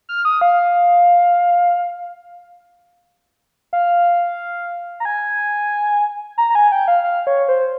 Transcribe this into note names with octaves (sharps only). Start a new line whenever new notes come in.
F6
D#6
F5
F5
A#5
G#5
A#5
A#5
G#5
G5
F5
F5
C#5
C5